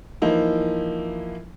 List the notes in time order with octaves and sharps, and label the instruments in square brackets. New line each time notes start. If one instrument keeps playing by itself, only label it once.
[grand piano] E3 F3 A#3 D#4 E4